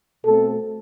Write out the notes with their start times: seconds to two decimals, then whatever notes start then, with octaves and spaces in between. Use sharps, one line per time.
0.25 B2 A3 C4 A4